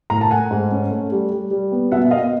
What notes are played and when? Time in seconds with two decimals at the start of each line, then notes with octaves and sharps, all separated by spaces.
0.10 A2 A#5
0.21 A5
0.31 A3 F#5 G#5
0.51 G#2
0.71 C#4
0.91 A3
1.12 G3
1.32 G3
1.51 G3
1.72 B3
1.92 B2 E5 F#5
2.11 B2 D#5 F5